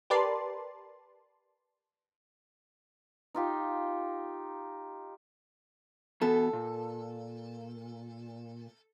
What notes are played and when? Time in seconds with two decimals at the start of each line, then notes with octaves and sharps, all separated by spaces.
0.10 G4 A#4 B4 D5 A5 C6
3.34 D#4 F4 G4
6.21 E3 B3 F#4 A4
6.53 A#2